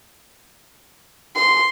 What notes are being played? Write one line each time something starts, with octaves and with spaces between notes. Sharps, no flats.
C6